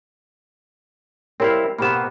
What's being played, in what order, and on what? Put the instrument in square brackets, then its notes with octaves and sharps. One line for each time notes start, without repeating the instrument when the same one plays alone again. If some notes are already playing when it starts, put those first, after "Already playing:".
[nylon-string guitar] G3 G4 [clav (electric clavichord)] C4 E4 F5 [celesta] A#4 C#5
[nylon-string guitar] B2 G4 C5 [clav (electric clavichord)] A#3 B3 [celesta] B5 E7